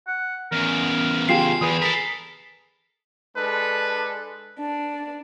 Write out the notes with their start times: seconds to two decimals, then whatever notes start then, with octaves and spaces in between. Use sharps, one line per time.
0.07 F#5
0.52 E2 C#3 A#4
1.29 F4 G4 G#4 C7 E7
1.61 E2 G#4 B4 D#6
1.82 A4 A#4 B6
3.36 G#3 D4 A4 B4
4.60 D4